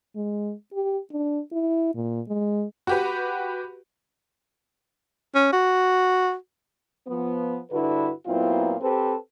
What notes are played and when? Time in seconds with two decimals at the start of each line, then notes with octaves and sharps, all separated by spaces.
0.16 G#3
0.73 G4
1.12 D4
1.52 E4
1.95 A#2
2.28 G#3
2.87 F#4 G4 B4
5.35 C#4
5.53 F#4
7.07 F3 B3
7.71 G2 D3 E4 F#4 B4
8.26 A#2 F#3 B3 C4 E4 F4
8.81 C4 G4 A4 B4 C5